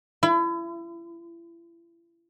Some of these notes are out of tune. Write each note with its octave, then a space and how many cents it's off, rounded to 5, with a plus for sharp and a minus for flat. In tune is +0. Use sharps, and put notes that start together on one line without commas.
E4 +35